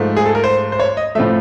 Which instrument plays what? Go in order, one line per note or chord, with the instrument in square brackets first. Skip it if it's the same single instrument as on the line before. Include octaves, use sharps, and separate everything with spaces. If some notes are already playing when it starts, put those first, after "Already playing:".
Already playing: [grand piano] G#2 F3 A3
G#4
A4
A#4
C5
C5
C#5
D#5
A2 F3 A3 E5